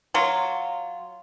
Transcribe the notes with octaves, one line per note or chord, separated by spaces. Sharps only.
F#3 F4